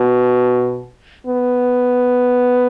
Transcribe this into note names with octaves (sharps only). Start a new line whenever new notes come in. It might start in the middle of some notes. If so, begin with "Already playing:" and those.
Already playing: B2
B3